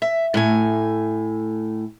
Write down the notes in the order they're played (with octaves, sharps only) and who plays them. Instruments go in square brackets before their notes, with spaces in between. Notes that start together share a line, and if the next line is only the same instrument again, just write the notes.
[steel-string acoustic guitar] E5
A2 A3 G#5